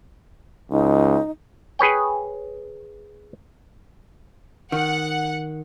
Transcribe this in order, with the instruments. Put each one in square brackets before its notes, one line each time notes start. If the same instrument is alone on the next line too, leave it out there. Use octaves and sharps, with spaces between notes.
[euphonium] C#2 [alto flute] D#4
[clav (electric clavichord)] G#4 B4 C#5 G5
[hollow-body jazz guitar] D#3 [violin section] F#5